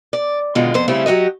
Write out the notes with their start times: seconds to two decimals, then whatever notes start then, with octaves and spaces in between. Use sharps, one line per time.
0.13 D5
0.55 B2 D3 D#3 G#3 F4 F#4
0.74 F2 B3 C5
0.88 C#3 G3 A3 C4 C#4 E4
1.06 F#3 F#4 G4 D#5